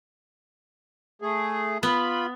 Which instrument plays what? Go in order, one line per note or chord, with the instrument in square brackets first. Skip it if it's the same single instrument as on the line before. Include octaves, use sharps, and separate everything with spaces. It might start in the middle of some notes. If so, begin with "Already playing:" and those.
[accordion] A3 G#4
[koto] B3 [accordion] F4 B5